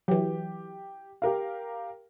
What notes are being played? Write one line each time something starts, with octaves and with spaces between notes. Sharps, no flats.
E3 F#3 G4
G4 A#4 F5